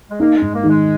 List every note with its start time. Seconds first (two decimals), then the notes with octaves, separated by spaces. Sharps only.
0.10 G#3
0.20 A#3 D#4
0.36 G#3
0.41 G#2
0.54 A#3
0.64 D#3
0.69 G#3